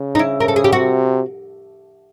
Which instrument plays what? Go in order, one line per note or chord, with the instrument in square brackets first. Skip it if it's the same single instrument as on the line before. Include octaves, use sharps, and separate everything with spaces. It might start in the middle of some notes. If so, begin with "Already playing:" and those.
Already playing: [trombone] C#3
[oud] D#4
E4
A#4
A4
G#4
G4
[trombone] C3 [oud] F#4